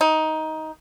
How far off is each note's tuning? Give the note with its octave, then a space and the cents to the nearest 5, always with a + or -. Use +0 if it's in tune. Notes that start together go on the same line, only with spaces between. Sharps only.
D#4 +15